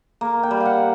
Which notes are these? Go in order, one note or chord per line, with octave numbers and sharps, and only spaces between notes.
A#3
G5
G3
F5
F#5